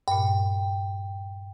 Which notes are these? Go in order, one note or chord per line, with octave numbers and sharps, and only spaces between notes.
G2 A#2 G5